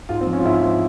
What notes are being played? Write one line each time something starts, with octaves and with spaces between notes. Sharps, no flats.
G#2 F4
C4
F3
C#4
F4
G#2 E4
F3